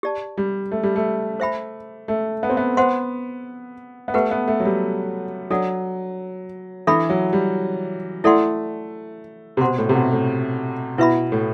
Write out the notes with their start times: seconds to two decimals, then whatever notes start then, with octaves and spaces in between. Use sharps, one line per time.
0.03 G4 D5 A5
0.37 G3
0.72 A3
0.83 G3
0.96 A3
1.40 C5 E5 G5 B5
2.08 A3
2.43 B3
2.50 C4
2.57 B3
2.77 B3 C5 F#5 C6
4.08 B3
4.14 A3 G4 B4 F#5
4.31 B3
4.48 A3
4.60 F#3
4.65 G3
5.50 F#3 D4 A4 D5 F#5
6.87 E3 D4 A4 E5 B5
7.10 F#3
7.33 G3
8.24 A3 E4 A4 D5 F#5 C6
9.57 C3
9.61 B2 C5 F#5 C6
9.78 A2
9.89 C3
9.95 B2
10.12 A2
10.98 B2 E4 B4 E5 B5
11.32 A2